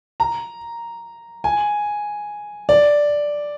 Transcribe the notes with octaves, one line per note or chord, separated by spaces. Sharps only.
A#5
G#5
D5